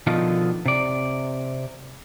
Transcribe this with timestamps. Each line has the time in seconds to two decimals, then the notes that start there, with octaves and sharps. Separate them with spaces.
0.07 B2 D3 D#3 F3 F4
0.66 C3 D5